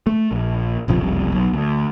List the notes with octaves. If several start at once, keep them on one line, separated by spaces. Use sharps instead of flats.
A3
A#1
F#1 B1 C3 F3
F#1 C2 F2
B1
D2